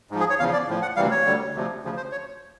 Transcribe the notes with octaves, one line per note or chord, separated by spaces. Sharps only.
G#2 F3
G#4
C#5
E2 C#3 F3 F5
D5
A2 F3
F#5
D2 C3 E3 G3 F5
C#5
D2 D3 G3
D2 C3 F3
D2 C#3 F3
C5
C#5